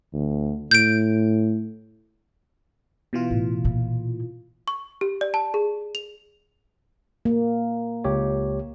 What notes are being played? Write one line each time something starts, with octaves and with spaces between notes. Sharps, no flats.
D2
A2 G6 D7
B2 E3 F4
A2
A#2 E4
C#6
G4
D5
A5
G#4
F7
A#3
C#2 G4 C#5